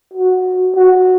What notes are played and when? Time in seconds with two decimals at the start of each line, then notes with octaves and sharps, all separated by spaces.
0.14 F#4
0.76 F#4